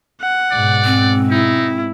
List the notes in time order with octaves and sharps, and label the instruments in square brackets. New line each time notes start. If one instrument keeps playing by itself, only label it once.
[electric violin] F#5
[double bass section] G#2 B2 [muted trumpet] D5
[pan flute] C4
[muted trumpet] D#4 [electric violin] E4